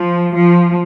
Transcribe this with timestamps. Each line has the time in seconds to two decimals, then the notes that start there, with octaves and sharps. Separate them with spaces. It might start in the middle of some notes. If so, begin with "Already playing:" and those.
Already playing: F3
0.34 F3